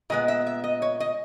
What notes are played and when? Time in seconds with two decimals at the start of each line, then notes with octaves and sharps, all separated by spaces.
0.10 A#2 G#3 B3 D#5
0.28 E5
0.47 E5
0.64 D#5
0.82 C#5
1.00 D#5